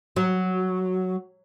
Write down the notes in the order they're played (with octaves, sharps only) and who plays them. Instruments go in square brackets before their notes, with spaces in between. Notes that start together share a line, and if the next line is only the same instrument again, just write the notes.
[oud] F#3